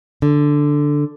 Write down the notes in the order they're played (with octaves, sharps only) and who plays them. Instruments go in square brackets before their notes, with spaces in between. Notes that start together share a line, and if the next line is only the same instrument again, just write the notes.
[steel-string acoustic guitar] D3